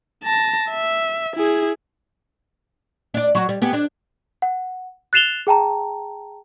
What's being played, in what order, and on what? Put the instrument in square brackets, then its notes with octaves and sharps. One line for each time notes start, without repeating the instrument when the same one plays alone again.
[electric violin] A5 A#6
E5
E4 G#4
[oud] D4 D5
F#3 F#4
G3
B3 G4 G#4
D4
[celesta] F#5
F#6 A6 C7 E7 F7 G7
G#4 G5 A5 A#5